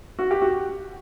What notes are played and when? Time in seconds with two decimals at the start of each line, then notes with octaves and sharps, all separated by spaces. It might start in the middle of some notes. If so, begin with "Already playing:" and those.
0.19 F#4
0.31 G4
0.41 F#4